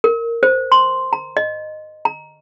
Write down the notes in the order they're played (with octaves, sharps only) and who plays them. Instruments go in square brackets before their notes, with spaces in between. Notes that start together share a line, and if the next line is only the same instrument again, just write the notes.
[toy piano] A#4
C5
C6
A#5
D#5
A#5